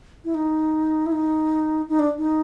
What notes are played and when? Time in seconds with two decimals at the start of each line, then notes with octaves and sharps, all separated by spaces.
0.25 E4
0.35 D#4
1.06 E4
1.12 D#4
1.89 D#4
1.99 D4
2.18 D#4